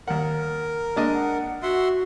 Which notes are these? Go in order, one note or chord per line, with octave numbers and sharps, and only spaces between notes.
D#2 A#4 F#5
G#3 A#3 D4 D#5
F#5
F#4 E5 F#5 C6